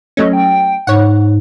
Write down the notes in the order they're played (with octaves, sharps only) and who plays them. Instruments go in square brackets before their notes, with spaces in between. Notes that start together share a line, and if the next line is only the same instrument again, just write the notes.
[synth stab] F#3 A3 C#4 [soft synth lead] D#5
[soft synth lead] G5
[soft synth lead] G#2 [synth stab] C#5 F#5